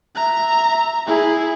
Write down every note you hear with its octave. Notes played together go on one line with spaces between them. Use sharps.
E5 A#5
E4 G#4